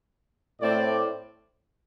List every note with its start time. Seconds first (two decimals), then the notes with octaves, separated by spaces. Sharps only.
0.61 A2 A3 C4 D5